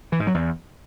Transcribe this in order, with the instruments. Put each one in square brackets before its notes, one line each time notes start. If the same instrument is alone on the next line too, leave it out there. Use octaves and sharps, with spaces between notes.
[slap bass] E3
G#2
F#3
E2